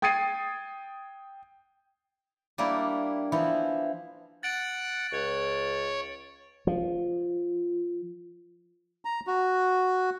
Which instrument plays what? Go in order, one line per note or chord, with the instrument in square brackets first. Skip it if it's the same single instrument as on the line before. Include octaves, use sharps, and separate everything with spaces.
[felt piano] G5 D#6 G#6 A6 C7 D#7
[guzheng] G3 A#3 D4 E4
E3 F3 B3 E4
[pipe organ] F#5 [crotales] A6 D7 F#7
[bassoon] C#2 [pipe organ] C#5
[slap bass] F3
[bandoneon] A#5
F#4